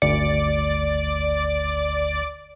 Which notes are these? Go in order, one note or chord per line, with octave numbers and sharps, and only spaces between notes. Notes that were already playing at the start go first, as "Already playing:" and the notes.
G1 D2 D5 C#7